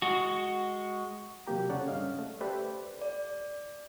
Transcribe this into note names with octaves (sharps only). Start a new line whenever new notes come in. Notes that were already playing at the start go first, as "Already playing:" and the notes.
G#3 F#4
E2 C3 F#3 A#3 G4 A#5
C#3 C#4 A4 C#5 D5 F#5
G2 C#4 D#5 F5
A3
G4 A4 B4 C5 D5 E5
D5